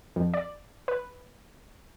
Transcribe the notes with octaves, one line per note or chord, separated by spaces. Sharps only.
F2
D5
B4